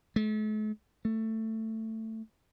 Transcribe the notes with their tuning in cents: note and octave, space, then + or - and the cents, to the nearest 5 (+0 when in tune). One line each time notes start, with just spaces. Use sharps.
A3 -45
A3 +15